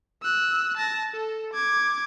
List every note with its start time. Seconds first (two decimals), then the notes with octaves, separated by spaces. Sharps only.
0.23 E6 F#6
0.77 A5 A#6
1.11 A4
1.54 D6 G#6